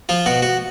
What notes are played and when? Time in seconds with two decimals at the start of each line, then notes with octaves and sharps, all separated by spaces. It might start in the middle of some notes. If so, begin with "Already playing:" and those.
0.09 F3 F4
0.26 B2 F#4
0.42 F#4